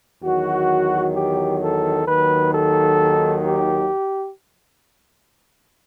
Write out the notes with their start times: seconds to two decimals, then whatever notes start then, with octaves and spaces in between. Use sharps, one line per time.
0.22 E2 D#3 F#3 F#4
1.15 G4
1.61 A4
2.07 D#2 D#3 F#3 B4
2.53 A4
3.45 G4